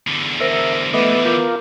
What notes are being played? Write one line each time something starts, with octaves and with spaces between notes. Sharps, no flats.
E2 D3
A#4 C5 E5 A#6 D#7
E3 F3 A3 B3 D#5 E5 D6
F4 A#4 D6 G6